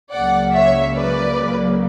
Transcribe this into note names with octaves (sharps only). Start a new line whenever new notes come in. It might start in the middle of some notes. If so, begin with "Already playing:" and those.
C#2 C#3 F#3 A#3 D5 F#5
C#5 E5
B4 D5